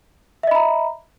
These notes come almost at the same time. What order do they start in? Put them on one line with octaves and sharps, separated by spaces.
E5 D#5 B5 A#5